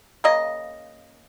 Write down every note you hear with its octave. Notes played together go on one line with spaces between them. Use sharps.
C#3 A#3 D#5